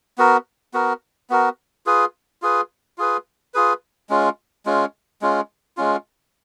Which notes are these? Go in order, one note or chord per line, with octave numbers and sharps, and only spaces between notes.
B3 F#4 A#4
B3 F#4 A#4
B3 F#4 A#4
F4 G#4 B4
F4 G#4 B4
F4 G#4 B4
F4 G#4 B4
G#3 C#4 F4
G#3 C#4 F4
G#3 C#4 F4
G#3 C#4 F4